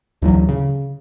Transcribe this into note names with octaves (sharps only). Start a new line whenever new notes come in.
D2 E3 F#3
C#3